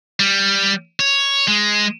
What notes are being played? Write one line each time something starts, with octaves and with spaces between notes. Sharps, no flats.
G3
C#5
G#3